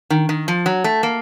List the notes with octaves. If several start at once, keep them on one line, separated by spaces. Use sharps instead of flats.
D#3
D#3
F3
F#3
A3
A#3